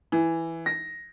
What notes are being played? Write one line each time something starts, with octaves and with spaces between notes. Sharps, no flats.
E3
A#6